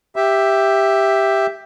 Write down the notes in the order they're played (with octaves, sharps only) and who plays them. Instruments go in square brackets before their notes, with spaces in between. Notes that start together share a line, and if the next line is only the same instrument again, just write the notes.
[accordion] G4 E5